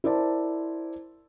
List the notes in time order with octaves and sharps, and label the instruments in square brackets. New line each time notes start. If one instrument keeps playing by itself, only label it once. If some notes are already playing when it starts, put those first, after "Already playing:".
[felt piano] E4 A#4 C5 D5 A5